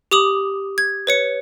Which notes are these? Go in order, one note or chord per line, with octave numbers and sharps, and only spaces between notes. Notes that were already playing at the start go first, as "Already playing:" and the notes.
G4 D6 D#6 F#7
G#6
B4 C#5 C#7